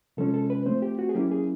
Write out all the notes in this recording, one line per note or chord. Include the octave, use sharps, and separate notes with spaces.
C3 F3 G#3 C#4 A4
A4
B4
F3 A3 C4 C5
G4
F#4
G#4
F#3 A#3 C#4 E4 G4
G#4